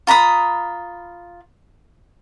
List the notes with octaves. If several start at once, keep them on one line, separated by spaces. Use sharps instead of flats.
F4 A#5 B5 D#6